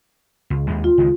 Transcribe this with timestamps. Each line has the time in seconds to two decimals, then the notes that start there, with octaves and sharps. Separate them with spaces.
0.50 C#2
0.67 D#2 G#3
0.84 F4
0.98 C#2 D#3 G#3